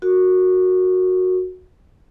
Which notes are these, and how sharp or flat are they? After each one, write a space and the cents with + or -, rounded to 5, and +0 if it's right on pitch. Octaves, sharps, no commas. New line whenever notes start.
F#4 -10 A#4 -20